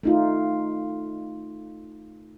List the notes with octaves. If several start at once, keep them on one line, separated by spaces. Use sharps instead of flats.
A3 D#4 F4